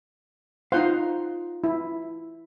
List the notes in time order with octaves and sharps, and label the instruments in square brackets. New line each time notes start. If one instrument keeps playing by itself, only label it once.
[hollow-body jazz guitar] D#4 F4 F5 [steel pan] C5 F#5 C6
[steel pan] E4